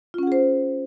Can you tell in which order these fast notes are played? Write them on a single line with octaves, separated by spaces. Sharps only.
F4 C#4 F#5 G#4 C5